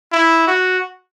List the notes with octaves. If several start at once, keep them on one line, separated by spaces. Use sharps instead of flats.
E4
F#4